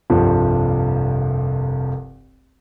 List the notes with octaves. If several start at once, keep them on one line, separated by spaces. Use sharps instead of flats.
F1 C2 G2 F3